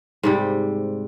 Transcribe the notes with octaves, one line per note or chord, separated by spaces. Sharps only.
G#2 C3 G3